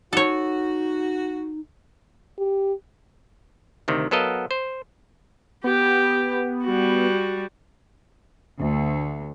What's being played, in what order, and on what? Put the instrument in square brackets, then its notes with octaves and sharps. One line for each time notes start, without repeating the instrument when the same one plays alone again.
[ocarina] D#4 [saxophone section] F#4 [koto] A4 C#5
[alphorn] G4
[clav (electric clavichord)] D2 C3 D#3
F#3 B3 A4 A#4 D#5 F5
C5
[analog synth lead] B3 [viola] G4
[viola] G3 F#4
[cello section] D2